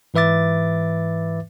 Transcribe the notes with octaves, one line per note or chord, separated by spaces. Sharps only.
G#2 E3 B4 E5 D6 A6